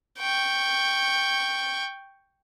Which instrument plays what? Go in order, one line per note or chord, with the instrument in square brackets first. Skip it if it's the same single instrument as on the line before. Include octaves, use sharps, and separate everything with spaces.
[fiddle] G5 C#6